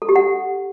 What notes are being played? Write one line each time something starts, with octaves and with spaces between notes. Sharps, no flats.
A4
G4
F#5